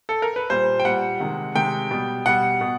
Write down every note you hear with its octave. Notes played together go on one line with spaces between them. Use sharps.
A4
A#4
B4
A#2 G3 C5
G5
A#2 G3 F#5
C3 D#3 G#3
C3 D#3 G#3 G5
B2 G3
B2 G3 F#5
B2